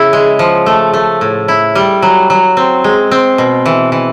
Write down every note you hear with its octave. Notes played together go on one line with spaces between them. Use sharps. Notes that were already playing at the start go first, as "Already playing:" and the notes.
Already playing: C#3 E4
G#3
F3
A3
A3
A2
E4
G3
F#3
F#3
C4
G#3
C4
B2
E3
E3